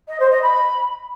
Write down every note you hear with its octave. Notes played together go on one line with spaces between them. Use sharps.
D#5
C5
D#5
B5